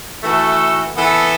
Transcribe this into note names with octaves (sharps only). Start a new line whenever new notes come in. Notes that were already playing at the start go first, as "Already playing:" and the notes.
E3 A3 F#4 A4
E3 B3 A4